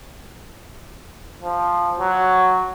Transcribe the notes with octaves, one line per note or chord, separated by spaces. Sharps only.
F3
F#3